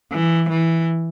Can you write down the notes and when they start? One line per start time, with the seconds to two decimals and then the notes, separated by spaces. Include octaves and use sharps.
0.12 E3
0.49 E3